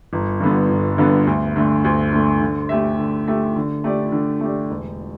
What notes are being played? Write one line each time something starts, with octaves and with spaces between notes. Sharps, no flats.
G1
G2 D3 B3
G1
G2 D3 B3
D2
D3 A3
D2
D3 A3
D3
A3 G4 E5
D3
A3 G4 E5
D3
A3 G4 D5
D3
A3 G4 D5
E1